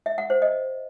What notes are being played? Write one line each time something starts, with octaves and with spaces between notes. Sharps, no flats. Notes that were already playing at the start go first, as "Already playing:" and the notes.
E5
F#5
C5
D#5